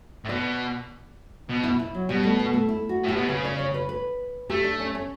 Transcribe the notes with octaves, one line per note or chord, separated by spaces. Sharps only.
A2
B2 D5
B2
E4
E4
F#3
B2 G3
A3
B3
A3
E4
F#4
A2 G4
B2
C#3 B4
D5
C#5
B4
B4
A3 G4
D4
C#4
C#4